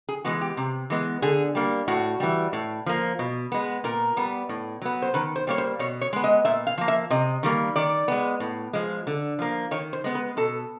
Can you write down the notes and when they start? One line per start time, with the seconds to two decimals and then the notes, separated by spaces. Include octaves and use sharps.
0.09 G#4
0.25 E3 G#3 B3 F#4
0.41 G4
0.57 C3
0.90 E3 G#3 B3
1.22 D3 G#4
1.55 G3 A#3
1.88 A2 F#4
2.20 E3 G3
2.53 A2
2.86 F3 A#3
3.19 B2
3.52 G#3 B3
3.84 A#2 A#4
4.17 G3 B3
4.49 A2
4.82 F#3 B3
5.02 C5
5.14 D#3 B4
5.36 C5
5.47 G3 A#3 C#5
5.58 C5
5.79 B2 C#5
6.01 C#5
6.13 G#3 B3
6.24 D#5
6.45 A#2 E5
6.67 F5
6.78 F3 A#3
6.88 E5
7.10 C3 D#5
7.43 D#3 G3 A#3
7.76 D#3 D5
8.08 G#3 B3
8.40 A2
8.73 F3 G#3
9.07 D3
9.39 F3 A#3
9.71 D#3 C#5
9.93 C5
10.04 G#3 B3
10.15 B4
10.37 B2 A4